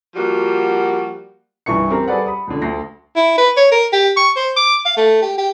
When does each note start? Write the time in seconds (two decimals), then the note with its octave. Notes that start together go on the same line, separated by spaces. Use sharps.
0.16 F3 G3 A#3 F#4
1.66 C2 G2 E3 C#6 C#7
1.90 C4 G4 A#4
2.08 G3 G#4 A4 B4 D5 F#5
2.26 B5 D#6
2.47 C#2 D3
2.62 D2 A#6 C7
3.16 E4
3.37 B4
3.56 C#5
3.71 A#4
3.92 G4
4.17 C#6
4.36 C5
4.56 D6
4.85 F5
4.97 A3
5.22 G4
5.38 G4